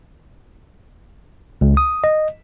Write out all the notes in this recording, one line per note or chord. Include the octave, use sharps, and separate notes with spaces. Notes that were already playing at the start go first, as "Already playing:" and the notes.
C#2
D#6
D#5